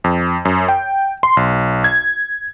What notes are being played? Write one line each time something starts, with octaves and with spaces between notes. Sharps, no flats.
F2
F#2
G5
C6
B1
G#6